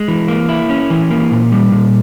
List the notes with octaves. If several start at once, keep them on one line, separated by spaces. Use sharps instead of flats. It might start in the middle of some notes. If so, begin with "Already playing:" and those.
Already playing: G#3
E3
A#3
E4
C#4
E3
A#3
A#2
G3
A#2